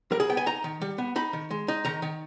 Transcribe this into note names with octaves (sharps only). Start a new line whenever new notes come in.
G3 A#4
G#4
B3 G5
G#5
D#4 A#5
D#3
G3
B3
D#4 B5
D#3
G#3
D#4
D#3 A#5
D#3